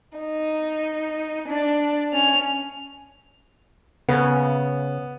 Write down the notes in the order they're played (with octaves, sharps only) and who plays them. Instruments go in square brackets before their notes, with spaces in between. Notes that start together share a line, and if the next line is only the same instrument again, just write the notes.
[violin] D#4
D4
C#4 F7
[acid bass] C#3 [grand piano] B3